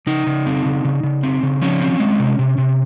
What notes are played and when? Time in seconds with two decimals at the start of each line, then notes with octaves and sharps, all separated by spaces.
0.07 C#3 D#4
0.27 C#3
0.46 C4
0.65 C#3
0.85 C#3
1.03 C#3
1.23 C4
1.43 C#3
1.62 F3 C#4
1.80 C4
2.00 G#3
2.20 C3
2.39 C3
2.58 C3